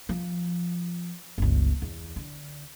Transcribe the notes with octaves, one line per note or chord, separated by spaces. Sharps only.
F3
G1 C#2
E2
D3